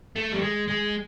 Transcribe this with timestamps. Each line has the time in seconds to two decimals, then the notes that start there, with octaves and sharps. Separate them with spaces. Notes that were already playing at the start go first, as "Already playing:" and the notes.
0.16 A3
0.32 G3
0.42 G#3
0.68 G#3